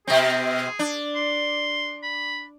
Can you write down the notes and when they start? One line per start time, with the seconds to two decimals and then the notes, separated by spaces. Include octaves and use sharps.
0.07 B2 C4 G#4
0.79 D4
1.16 C6
2.03 B5